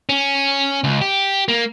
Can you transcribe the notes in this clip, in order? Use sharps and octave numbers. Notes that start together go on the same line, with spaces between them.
C#4
C#2
G4
A#3